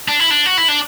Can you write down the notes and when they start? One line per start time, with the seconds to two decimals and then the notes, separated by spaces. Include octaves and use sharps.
0.08 D4
0.20 E4
0.31 D4
0.46 F#4
0.57 E4
0.68 D4